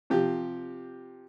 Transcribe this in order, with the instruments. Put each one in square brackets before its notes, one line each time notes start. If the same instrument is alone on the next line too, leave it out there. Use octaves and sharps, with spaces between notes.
[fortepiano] C3 F3 G4